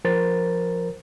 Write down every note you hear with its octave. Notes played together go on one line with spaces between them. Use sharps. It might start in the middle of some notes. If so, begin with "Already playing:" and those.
F3 A#4 C5 A6